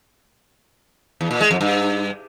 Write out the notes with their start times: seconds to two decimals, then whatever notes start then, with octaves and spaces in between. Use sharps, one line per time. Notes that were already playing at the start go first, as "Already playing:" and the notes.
1.21 E2
1.31 A#2
1.41 G#3
1.51 F2
1.61 G2